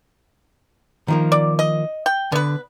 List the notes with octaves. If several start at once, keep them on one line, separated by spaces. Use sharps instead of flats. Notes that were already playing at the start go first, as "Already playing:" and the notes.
D#3 F3 A#3
D5
D#5
G5
D3 B3 B4